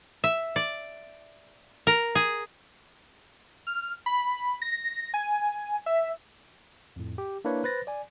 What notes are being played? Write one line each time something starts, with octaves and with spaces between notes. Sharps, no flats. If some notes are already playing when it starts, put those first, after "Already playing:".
E5
D5
A#4
G#4
F6
B5
A#6
G#5
E5
F2 A2
G4
A#3 D4 E4 B4 C#5
B4 C5 A6 A#6
D5 G#5